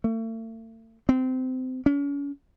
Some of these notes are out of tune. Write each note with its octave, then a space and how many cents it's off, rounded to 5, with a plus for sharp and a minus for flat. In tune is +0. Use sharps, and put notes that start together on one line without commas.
A3 +40
C4 -25
C#4 +40